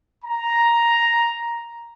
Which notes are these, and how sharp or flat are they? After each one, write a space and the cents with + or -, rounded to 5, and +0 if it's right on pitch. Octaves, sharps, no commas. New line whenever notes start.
A#5 +5